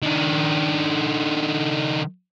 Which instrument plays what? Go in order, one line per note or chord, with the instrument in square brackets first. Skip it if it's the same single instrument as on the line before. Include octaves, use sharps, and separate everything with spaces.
[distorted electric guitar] D#3 D4